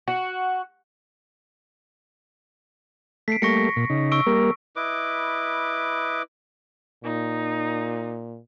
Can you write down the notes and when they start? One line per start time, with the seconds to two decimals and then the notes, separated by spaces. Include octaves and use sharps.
0.08 F#4
3.28 A3 B6 C7 D7
3.42 G3 A3 A#3 C#6 A#6 C#7
3.76 A#2
3.90 C#3 D#4
4.12 C#6 E6 D7
4.27 G3 A#3 A#4
4.76 E4 B4 D#5 D6
7.04 A#2 D#4